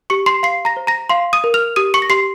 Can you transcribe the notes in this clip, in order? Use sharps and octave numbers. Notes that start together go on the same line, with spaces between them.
G4 C#6 C#7
C6 C7
F5 C6 C7
A#5 A#6
C5
A#5 A#6
F5 C6 C7
D#6 D#7
A#4
F6 F7
G4 D#6 D#7
C#6 C#7
A#6
G4 C6 C7